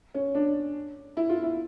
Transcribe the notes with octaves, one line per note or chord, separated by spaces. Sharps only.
C#4
D4
E4
F4
E4